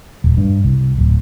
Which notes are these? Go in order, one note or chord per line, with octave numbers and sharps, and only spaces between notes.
D#1
G2
C2
D1